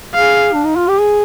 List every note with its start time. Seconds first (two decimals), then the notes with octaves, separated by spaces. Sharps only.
0.14 G#4 F5
0.53 D4
0.64 D#4
0.76 F4
0.88 G4
1.00 G#4